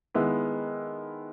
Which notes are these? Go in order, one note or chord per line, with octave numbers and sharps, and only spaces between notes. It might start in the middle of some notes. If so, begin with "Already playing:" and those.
D#3 G#3 B3 E4